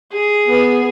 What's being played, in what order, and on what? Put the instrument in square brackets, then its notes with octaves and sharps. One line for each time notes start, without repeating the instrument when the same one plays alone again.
[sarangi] G#4
[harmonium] B3